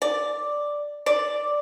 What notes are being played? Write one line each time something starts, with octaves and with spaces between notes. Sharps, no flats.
D5
D5